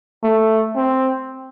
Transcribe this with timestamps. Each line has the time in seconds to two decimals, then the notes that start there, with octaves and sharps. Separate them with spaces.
0.23 A3
0.76 C4